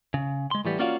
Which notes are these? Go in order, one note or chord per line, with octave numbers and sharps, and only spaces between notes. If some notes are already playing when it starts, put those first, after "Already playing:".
C#3
G#3 C6
A2 E3 G3 B3
A#3 C#4 F4 F#4 D5 F5